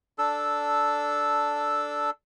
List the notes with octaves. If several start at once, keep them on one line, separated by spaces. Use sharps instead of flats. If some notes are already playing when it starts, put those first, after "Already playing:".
D4 A4 E6